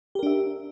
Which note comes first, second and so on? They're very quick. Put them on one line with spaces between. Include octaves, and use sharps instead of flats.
G4 A#4 D4 E5